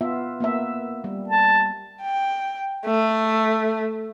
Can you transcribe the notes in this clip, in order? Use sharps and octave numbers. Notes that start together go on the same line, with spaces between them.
B3 F4 E5
A#3 B3 E5
G3
A5
G5
A3